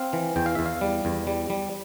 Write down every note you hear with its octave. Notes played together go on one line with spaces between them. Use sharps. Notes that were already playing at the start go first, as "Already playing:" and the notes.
Already playing: C4 F5
E3
E2 G5
F5
E2 E5
F5
G3
E2
G3
G3